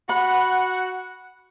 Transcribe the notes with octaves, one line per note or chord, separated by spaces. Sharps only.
F#4 F#5 B5